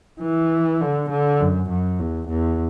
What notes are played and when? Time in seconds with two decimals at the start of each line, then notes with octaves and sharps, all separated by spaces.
0.21 E3
0.81 D3
1.10 D3
1.40 F#2
1.69 F#2
1.99 E2
2.28 E2